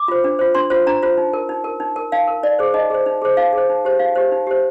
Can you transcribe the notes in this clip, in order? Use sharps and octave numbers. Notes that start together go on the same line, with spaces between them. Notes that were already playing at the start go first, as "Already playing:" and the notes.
Already playing: D6
F4 C5
D4
F4 C5
D4 C6
F4 C5
D4 A#5
F4 C5
D#4
A#4
D#4
A#4
D#4
A#4
D#4 F5
A#4
D#4 D5
G#4 C5
D#4 D#5
G#4 C5
D#4
G#4 C5
D#4 F5
G#4 C5
D#4
G4 C5
D#4 F5
G4 C5
D#4
G4 C5